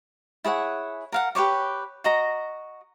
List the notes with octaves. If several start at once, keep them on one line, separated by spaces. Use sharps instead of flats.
E4 G#4 C#5 F#5
A#4 F5 F#5
G4 B4 C#5 D6
F#4 D#5 A#5